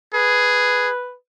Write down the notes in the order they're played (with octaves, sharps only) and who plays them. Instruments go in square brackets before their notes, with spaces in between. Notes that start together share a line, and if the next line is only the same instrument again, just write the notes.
[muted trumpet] G#4 [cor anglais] B4